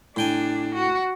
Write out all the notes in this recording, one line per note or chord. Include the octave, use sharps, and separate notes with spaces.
A2 D4 G5 G#5
F#4